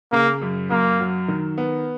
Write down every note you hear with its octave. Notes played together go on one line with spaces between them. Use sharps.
C#3 A#3
F#2
F#2 A#3
F#3
D#3
B3